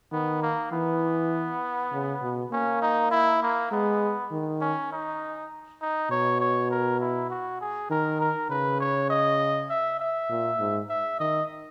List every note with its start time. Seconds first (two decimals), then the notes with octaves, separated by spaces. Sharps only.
0.12 D#3 B3
0.42 A#3
0.72 E3 B3
1.92 C#3
2.22 B2
2.52 A#3 C#4
2.82 D#4
3.11 E4
3.42 A#3
3.72 G#3 B3
4.31 D#3
4.61 C#4
4.92 D#4
5.81 D#4
6.11 B2 C#5
6.41 C#5
6.71 A#4
7.00 E4
7.30 F#4
7.61 G#4
7.90 D#3 A#4
8.20 A#4
8.50 C#3 B4
8.80 C#5
9.10 D#5
9.70 E5
10.00 E5
10.30 A#2
10.60 G#2
10.89 E5
11.19 D#3 D#5